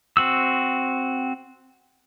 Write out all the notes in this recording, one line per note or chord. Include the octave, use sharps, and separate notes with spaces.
C4 F#4 E6